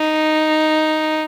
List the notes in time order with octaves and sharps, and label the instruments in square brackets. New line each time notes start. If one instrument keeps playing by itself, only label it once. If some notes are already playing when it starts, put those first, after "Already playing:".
Already playing: [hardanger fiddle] D#4